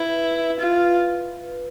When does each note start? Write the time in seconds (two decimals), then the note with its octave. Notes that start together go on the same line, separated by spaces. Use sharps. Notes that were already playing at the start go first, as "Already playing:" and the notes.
Already playing: E4 B4
0.60 F4